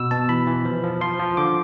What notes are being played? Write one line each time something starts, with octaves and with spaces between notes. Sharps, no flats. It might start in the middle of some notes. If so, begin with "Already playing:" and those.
Already playing: B2 E6
B2 A5
E3 B5
E3
F3
F3
F3 C6
F3
D3 D6